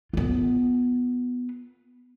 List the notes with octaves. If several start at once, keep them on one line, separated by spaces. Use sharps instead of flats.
B3 F4